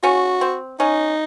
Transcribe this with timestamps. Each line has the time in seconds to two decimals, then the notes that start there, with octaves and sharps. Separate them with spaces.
0.03 C#4 F#4
0.41 C4
0.80 C#4 D#4